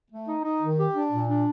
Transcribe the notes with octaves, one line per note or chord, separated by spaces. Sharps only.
A3
D#4
D#4
D#3
G4
D4
A#2
D4